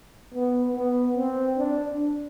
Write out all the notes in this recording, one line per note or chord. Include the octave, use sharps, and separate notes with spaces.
B3
B3
C4
D4